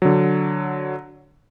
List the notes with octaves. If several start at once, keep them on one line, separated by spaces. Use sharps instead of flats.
D3 F#3